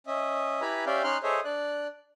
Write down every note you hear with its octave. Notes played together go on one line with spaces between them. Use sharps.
C#4 D#5 E5
E4 G4 B4 G#5 A#5 B5
C#4 G4 D5 E5 F5 G5
C#4 D#4 C6 F6 F#6
G#4 A4 C5 C#5 D#5 E5
D4 D5 F#6